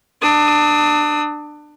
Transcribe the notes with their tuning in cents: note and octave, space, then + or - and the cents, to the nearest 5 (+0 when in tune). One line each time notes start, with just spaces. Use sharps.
D4 +25 D#6 +45